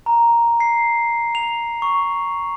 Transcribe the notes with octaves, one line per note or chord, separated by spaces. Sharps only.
A#5
C7
F7
C#6